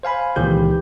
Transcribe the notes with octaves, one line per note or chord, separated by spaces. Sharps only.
C5 F5 G#5 B5
C#2 A#2 D#3 E3 G4 G6